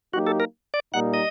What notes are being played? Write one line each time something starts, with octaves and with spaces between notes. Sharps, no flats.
F#3 A#3 D#4 F#4 G4
A4
A#4
D5
A#2 G3 A#3 D#4 F#5
D#5